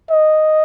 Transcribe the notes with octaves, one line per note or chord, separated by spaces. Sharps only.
D#5